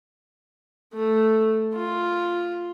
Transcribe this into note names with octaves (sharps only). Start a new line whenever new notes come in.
A3
F4